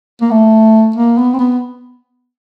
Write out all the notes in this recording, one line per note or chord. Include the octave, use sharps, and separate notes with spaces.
A#3
A3
A#3
B3
C4
B3